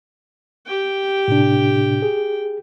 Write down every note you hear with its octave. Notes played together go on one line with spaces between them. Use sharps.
G4 G5
A2 C3 D4
G#4